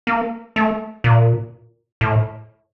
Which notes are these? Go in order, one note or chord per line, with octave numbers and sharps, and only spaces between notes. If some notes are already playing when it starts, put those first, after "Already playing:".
A#3
A3
A#2
A2